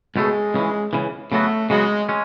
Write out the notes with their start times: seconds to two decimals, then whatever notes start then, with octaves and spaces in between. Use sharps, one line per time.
0.16 C#2 B2 G#3 A3
0.54 C#2 C#3 E3
0.93 C#2 C#3 E3
1.32 C#3 F#3 A3 B3 F#4
1.70 C#3 F#3 G#3 B3 F#4
2.09 G#3 C#4